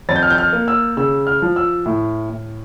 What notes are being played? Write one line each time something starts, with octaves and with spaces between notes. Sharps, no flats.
F2 A6
G6
F6
G6
F6
A#3
E6
C#3 E6
F6
F3
E6
A2
A2